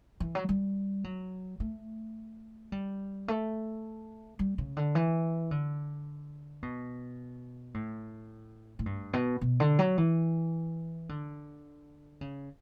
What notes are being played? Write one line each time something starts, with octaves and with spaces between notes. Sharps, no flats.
E3
F#3
G3
F#3
A3
G3
A3
G3
C#3
D3
E3
D3
B2
A2
A2
G2
B2
B2
D3
F#3
E3
D3
C#3